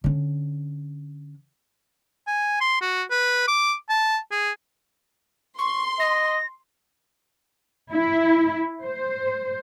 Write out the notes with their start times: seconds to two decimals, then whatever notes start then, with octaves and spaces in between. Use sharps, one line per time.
0.04 D3 C#4
2.27 G#5
2.61 C6
2.82 F#4
3.11 B4
3.48 D6
3.90 A5
4.32 G#4
5.58 C6 C#6
6.00 D#5 A#6
7.91 E4
8.82 C5